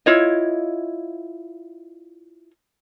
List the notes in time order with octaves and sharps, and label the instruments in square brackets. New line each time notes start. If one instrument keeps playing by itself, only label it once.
[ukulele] E4 F4 C#5 D#5